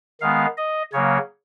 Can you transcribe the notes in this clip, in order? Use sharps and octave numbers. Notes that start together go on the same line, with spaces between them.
D#3 G#3 B3 F5
D#5
C#3 F#3 A#3 C#5